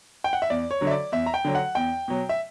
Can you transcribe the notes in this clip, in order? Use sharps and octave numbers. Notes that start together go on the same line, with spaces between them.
G5
F#5
E5
E2 D5
C#5
D3 F#3
E5
D5
E2 E5
A#5
G5
D3 F#3
F#5
E2 G5
B2 F#3
E5